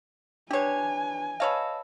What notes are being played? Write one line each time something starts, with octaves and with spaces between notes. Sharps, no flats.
D4 G4 B4 C#5 G#5
B4 C#5 D#5 F5 A5 E6